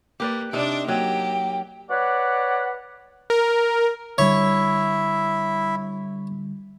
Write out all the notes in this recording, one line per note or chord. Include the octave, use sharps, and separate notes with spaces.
A#3 G4 B4 D5
C3 D4 D#4 D5
F#3 A#3 G4 G5
B4 C#5 D5 F#5
A#4
D3 G3 E4 C#5 E5